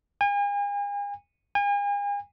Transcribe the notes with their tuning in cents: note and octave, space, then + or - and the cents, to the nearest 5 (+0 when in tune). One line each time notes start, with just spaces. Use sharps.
G#5 -40
G#5 -40